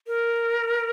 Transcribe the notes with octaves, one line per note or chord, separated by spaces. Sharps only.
A#4